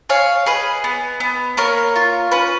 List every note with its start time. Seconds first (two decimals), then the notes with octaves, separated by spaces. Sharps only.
0.09 G#4 C#5 F5
0.46 G#4 B4 D#5
0.84 B3
1.20 B3
1.57 A#3 A#4 C#5
1.96 F4
2.31 C#4 B4